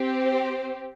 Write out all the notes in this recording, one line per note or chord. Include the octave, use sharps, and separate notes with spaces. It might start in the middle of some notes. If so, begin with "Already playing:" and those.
Already playing: C4 G4
C5